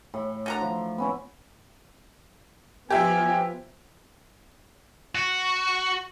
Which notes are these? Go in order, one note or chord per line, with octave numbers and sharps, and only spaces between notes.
A2
D3 F#4 A#5
F3
B3 C#4 E4
F3 B3 G4 E5 G#5
F#4